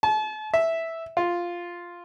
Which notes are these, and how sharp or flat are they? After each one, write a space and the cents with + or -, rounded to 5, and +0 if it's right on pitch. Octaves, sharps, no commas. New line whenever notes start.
A5 -40
E5 -5
F4 +0